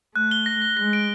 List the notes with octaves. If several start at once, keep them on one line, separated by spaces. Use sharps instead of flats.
A3 F#6
G7
A#6
A#6
G#3 A#6
D7